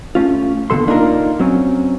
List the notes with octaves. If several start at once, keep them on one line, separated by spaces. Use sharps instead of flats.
A3 C#4 F4
D#2 B2 D3 E3 A4 C6
A#3 D4 D#4 F4 A4 A#4
F#3 C4 C#4